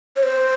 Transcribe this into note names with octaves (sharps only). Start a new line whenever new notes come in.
C#5
C5